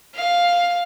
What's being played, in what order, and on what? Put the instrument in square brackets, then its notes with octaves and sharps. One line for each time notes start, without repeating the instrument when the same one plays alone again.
[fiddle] F5